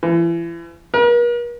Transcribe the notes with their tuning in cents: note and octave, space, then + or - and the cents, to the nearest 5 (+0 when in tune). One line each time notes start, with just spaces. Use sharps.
E3 +35
A#4 +45